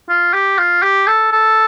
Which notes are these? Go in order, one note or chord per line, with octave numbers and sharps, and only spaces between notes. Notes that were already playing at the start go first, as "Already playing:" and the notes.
F4
G4
F4
G4
A4
A4